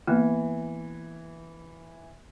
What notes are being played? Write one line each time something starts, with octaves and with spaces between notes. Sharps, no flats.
E3 A#3 B3